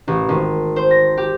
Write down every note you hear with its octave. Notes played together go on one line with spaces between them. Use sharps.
A1
G#1
C5
A#6
G4